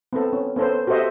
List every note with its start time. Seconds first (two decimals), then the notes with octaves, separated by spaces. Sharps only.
0.13 B3 C4 A4
0.33 C#4
0.56 B3 C#4 A4 C5
0.87 F#4 G4 A4 C5 D#5 E5